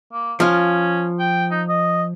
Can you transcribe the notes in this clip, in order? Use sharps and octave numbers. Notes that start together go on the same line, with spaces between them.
A#3
F3 C#4 F4
G5
D#4
D#5